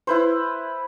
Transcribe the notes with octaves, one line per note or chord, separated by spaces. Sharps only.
E4 B4 C5